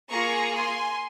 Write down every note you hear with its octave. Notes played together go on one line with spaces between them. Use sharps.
A#3 F4 G#4 A#5 C#6
G#5 C6